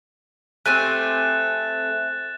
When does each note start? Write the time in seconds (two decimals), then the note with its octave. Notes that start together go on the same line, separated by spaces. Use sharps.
0.66 A3 C4 G4 G#5 F6 F#6 A6 E7